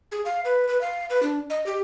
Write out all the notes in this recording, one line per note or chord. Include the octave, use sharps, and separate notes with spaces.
G#4
F5
B4
B4
F5
B4
D4
D#5
G4